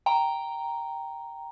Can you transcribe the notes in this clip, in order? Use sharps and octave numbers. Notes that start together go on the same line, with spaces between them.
G5 A#5